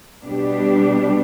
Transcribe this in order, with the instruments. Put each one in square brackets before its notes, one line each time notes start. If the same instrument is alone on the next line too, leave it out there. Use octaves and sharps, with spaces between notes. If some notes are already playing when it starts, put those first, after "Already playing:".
[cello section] B2 G3 D4 G4